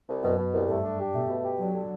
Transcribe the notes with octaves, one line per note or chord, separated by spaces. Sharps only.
C2
F#2 B2
B2
C2
G2 A3
D4
G4
B2 A3
B2
G4
D3 F#3
D3